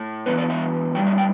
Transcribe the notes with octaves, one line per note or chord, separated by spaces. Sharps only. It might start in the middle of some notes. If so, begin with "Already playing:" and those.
Already playing: A2 A3
E2 E3 B3 D4 B4
D5
E5
A2 G3 D4 G5
E5
G5